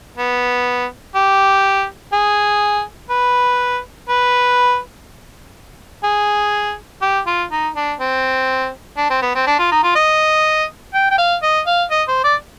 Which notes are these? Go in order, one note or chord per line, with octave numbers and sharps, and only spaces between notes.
B3
G4
G#4
B4
B4
G#4
G4
F4
D#4
D4
C4
D4
C4
B3
C4
D4
F4
D#4
F4
D#5
G5
G5
F5
D#5
F5
D#5
C5
D5